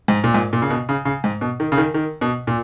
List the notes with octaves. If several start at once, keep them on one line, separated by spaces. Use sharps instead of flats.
G#2
A#2
G#2
A#2
C#3
B2
C#3
C#3
G#2
B2
D#3
C#3
D#3
D#3
B2
A#2